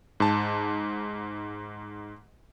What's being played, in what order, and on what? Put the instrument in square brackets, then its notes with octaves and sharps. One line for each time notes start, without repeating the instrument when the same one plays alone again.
[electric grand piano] G#2 A5